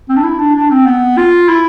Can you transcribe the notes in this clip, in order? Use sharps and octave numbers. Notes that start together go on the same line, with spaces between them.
C4
D4
E4
D4
D4
C4
B3
F4
E4